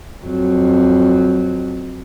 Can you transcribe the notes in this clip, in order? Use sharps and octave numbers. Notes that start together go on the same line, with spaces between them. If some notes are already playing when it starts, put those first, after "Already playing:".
F2 F#3